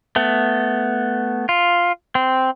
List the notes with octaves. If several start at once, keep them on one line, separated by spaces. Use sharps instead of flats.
A3 B3
F4
C4